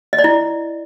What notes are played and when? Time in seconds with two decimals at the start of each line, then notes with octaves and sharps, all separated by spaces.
0.13 D#5
0.19 D5
0.24 E4